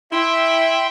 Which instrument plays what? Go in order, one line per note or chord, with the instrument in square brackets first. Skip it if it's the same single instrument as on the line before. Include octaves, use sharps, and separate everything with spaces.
[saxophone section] E4 [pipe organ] E5 G5 C6